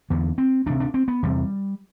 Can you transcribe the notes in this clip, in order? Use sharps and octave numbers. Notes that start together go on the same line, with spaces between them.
E2 D3 B3
C4
D2 C3 D4
D4
C4
B3
E2 C3 G3